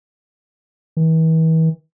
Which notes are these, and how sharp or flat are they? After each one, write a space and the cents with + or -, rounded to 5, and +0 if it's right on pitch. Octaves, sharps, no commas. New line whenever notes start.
E3 -40